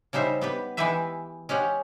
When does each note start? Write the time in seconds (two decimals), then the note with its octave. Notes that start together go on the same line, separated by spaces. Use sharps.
0.13 C#3 G3 D#4 C5 E5
0.41 B3 G4 B4
0.77 E3 G#3 E4 G4 B4 E5
1.49 G#3 C#4 G4 F#5